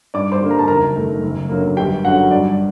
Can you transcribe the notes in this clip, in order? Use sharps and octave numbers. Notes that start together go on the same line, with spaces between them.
G2 D5 D6
C5 C6
D3 G3 A#3
A#5
A5
F#1 A#4 A#5
F#2 D#3 A3
F#1
F#2 D3 F#3 A#3
G1 G4 G5
F#2 D3 F#3 F#4 F#5
G2 D5